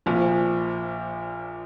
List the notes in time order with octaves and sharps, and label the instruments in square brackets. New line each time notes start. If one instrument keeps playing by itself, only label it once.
[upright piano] A#1 A#2 F3